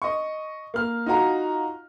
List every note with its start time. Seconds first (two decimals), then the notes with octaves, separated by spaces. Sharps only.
0.02 D#5 C#6
0.74 A#3 F6
1.06 D#4 F4 F#4 F5 A#5